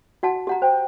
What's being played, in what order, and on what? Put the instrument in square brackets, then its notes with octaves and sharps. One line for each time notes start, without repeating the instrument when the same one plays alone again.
[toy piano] F#4 F#5 A5
G4 F#5 A#5
[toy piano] C5 [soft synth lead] G5